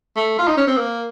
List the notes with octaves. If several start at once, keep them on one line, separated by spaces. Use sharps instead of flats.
A3
F4
D#4
C#4
C4
A#3